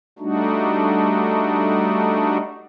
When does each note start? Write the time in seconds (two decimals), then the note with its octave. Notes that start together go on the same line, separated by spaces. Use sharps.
0.19 G3 A3 D4 D#4 F#4